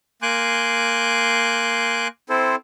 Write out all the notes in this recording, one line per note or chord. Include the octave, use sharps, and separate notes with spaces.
A#3 G#5 C6 D6 F#6 G6
C4 E4 A4 C5